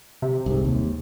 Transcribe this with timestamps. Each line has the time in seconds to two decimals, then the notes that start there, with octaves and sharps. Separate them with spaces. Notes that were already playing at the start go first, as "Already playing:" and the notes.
0.22 C3
0.46 C2 G#2
0.65 D#2